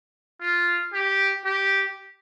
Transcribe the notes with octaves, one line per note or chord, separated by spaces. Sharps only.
F4
G4
G4